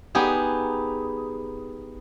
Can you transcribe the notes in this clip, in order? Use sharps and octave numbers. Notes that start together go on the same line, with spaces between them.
B3 D#4 G4 G#4